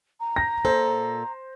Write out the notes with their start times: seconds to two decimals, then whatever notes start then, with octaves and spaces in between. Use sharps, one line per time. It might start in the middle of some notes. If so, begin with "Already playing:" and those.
0.20 A#5
0.36 A#6
0.65 A#2 A4 C5